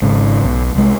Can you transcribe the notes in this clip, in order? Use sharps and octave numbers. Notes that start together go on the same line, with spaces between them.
G#1 G#2 C#3
B1
C2 G#3